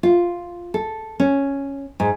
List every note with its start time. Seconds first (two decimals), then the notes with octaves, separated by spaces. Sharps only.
0.03 F4
0.74 A4
1.20 C#4
2.00 G#2